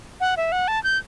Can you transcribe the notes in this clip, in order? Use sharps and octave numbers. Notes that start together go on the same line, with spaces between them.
F#5
E5
F#5
A5
G6